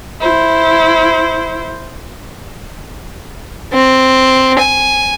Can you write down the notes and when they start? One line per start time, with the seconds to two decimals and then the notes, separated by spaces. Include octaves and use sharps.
0.21 E4 C5
3.73 C4
4.59 G#5